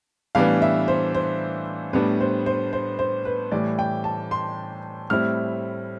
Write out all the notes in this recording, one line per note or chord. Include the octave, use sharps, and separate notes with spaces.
A2 E3 G3 B3 D4 F5
E5
C5
C5
A2 G3 B3 D4 B4
C5
C5
C5
C5
B4
A2 E3 G3 D5
G5
A5
C6
A2 G3 C4 E4 F6